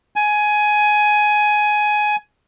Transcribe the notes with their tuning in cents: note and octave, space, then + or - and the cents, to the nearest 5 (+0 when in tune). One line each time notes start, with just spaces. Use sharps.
G#5 +15